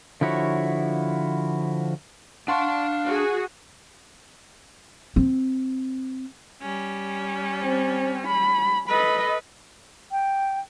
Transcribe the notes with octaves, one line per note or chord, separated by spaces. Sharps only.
D3 F3 E4 F#4 C#5
D4 F5 F#5 A5 C6 C#6
F#4 G#4
C4
G3 C#4
C4
B5
A4 B4 D#5 B5
G5